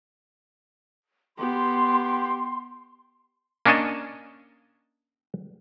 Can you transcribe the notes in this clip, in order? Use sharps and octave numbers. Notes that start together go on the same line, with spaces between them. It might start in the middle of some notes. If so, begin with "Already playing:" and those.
B3 G4 C6
A#3 C#4 D4 C#5 D#5 A5